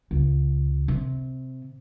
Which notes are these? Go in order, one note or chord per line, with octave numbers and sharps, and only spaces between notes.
C#2
C3